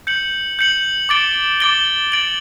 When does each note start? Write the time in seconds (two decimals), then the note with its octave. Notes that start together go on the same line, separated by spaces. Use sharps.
0.07 G6 C#7 F#7
0.59 G6 C#7 F#7
1.09 D6 A6 D7 G7
1.60 D6 A6 D7 G7
2.12 A6 D7 F#7